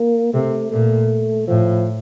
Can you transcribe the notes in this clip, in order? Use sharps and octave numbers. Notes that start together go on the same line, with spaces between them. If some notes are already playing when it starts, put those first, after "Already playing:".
Already playing: A#3
C3 A3
A#2 A3
A2 F3